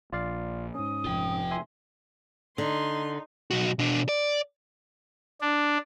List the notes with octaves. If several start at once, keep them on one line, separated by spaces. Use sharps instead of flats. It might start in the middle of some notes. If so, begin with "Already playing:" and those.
A#1 F4 D5 F5
G#2 C#4 D#6
F1 F2 F4 G5
E5 G#5 C6
D3 D#4 C6
B1 F#4
B2 D4
D5
D4